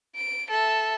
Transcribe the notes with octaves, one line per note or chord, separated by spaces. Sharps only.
D7
A4 E5